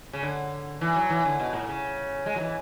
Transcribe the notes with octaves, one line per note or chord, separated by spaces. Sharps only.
C#3
D3
E3
F#3
E3
D3
B2
A2
C#3
G#3
F#3
E3